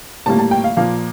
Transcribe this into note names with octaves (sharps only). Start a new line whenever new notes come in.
A2 G3 A#3 A5
A5
G5
F5
A#2 F3 A#3 F5